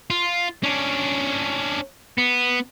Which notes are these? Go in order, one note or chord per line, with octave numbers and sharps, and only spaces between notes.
F4
C#4 D4
B3